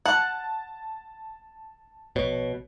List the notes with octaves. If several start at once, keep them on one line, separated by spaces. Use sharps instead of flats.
F#5 A5
A#1 B2 C#5